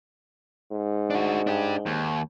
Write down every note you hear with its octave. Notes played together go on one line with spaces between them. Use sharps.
G#2
D4 F#4
D4 G4
D#2